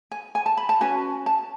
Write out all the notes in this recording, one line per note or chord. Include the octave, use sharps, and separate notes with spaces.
G#5
G#5
A5
B5
A5
C#4 F#4 B4 G#5
A5